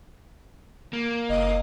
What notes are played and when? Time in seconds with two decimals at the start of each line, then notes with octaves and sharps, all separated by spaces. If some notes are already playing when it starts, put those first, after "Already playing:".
0.93 A#3
1.29 F#1 D#5